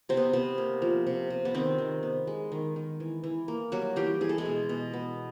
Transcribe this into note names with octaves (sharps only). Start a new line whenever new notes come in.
C3 C4
B3
C3 B3
A#3
F3
C3
C3
B3
D#3 C4
D#3
B3
G#3
D#3
D#3
E3
E3
A#3
F#3 G3 F#4
E3 G3 G4
E3 G#4
A4
G#3 G#4
B2
B2
B3